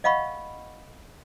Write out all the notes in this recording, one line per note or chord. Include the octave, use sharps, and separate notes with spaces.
D#5 F5 F#5 B5 C#6